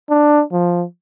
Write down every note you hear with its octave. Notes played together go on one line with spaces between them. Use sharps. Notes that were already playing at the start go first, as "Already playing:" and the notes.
D4
F3